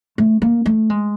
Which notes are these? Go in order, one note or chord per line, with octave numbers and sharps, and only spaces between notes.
A3
A#3
A3
G#3